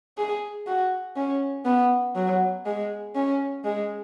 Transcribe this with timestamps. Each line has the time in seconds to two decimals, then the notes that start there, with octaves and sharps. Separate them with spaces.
0.18 G#4
0.67 F#4
1.16 C#4
1.66 B3
2.16 F#3
2.66 G#3
3.16 C#4
3.64 G#3